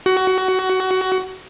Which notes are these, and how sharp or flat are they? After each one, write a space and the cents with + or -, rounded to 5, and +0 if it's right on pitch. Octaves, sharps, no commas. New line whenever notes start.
F#4 +20